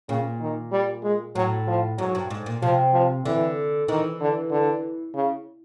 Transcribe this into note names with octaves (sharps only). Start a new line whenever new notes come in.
A#2 C#3
D#3
G3
G#3
A2 F#3
F3
G#2 F#3
G2
G#2
A#2
C3 F3
F3
D3 E3
D#3 E3
D3
D3
C#3